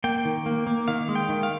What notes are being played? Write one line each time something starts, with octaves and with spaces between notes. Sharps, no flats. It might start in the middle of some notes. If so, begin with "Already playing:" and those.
A#3 G5
D#3
A#3
A#3
D#3 F5
G#3
G5
D#3
F5